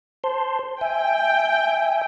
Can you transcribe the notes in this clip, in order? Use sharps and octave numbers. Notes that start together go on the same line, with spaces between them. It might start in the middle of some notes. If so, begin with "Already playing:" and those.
C5 A5 C6
E5 G5 G#5